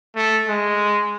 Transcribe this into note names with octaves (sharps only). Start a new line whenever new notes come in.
A3
G#3